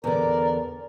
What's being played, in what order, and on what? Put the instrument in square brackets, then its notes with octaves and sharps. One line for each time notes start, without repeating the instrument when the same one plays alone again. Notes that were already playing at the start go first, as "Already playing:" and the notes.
[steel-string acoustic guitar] E2 D3 [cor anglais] A#4 [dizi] D5